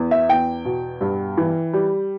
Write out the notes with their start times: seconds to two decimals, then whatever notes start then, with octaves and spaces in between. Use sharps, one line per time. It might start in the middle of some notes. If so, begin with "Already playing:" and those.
Already playing: E2
0.11 E5
0.29 E2 G5
0.65 B2
1.01 G2
1.37 E3
1.73 G3